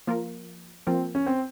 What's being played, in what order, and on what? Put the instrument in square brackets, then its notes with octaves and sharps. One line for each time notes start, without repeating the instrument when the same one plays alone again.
[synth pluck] F3 A#3 F4 A#4
[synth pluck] F3 A#3 F4 A#4 [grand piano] C4
[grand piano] C#4
C4